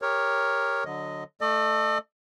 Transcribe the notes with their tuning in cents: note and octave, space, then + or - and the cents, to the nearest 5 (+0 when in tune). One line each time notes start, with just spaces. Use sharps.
G4 +25 A#4 +0 C#5 +0
D3 +0 F#3 -20 D#5 +0
A3 +0 A4 +0 D#5 -45